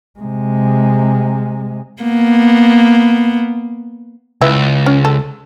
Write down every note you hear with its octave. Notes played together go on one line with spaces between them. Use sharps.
C3 G#3
A#3 B3
C#2 E4 B4 E5
C#4
A4